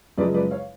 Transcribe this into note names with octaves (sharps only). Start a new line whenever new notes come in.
F#2 C#3 F3 G#3 B4 D5
B4 D5
C#5 F5